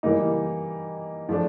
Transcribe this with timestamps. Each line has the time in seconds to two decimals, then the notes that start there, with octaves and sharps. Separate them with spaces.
0.03 E3 G3 A#3 D#4
1.28 C#3 F3 A3 D4